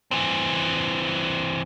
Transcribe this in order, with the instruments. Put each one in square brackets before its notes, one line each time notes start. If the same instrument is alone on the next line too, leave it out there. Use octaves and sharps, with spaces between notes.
[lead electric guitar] E3 C4